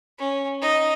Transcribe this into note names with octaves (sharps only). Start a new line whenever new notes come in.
C#4
D#4 D#5